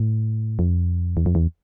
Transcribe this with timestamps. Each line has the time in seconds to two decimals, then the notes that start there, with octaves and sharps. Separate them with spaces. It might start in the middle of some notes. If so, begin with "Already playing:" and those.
Already playing: A2
0.59 F2
1.17 E2
1.26 F2
1.35 E2